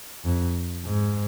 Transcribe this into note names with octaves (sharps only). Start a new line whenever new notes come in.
F2
G#2